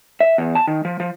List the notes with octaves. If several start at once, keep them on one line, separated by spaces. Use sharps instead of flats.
E5
E2
A5
D#3
F3
F3